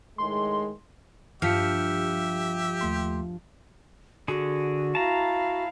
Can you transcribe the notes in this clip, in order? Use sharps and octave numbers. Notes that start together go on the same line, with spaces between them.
A2 D#3 G#3 C6
G2 F3 G4 E5 F6 B6 C#7
D#2 A3 C6
D3 F#4 G#4
E4 F5 A5 A#5